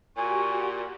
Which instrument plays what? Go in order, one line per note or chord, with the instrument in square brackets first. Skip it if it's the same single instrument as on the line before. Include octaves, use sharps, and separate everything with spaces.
[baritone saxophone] A#2 [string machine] F#4 G4 [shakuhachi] G#5 [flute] C#6